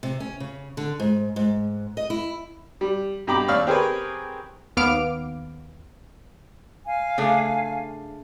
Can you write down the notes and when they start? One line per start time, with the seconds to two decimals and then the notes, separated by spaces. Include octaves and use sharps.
0.03 C3
0.20 C#4
0.40 C#3
0.77 D3
1.00 G#2
1.36 G#2
1.97 D#5
2.10 E4
2.81 G3
3.27 G2 B2 G4 A#5 B5 D6
3.48 D#2 D5 F5 C#6 E6 F6
3.67 C4 G4 G#4 A#4 B4 C#5
4.77 D#2 B3 F5 D6 F6 D7
6.85 F5 G#5
7.18 C#3 A3 D4